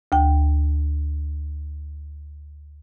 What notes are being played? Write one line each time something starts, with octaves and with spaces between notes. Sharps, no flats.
D2 G5